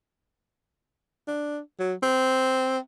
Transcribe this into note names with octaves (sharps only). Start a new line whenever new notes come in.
D4
F#3
C4